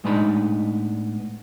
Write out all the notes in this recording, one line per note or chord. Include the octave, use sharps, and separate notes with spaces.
A2 G#3 B3 D4 D#4 B5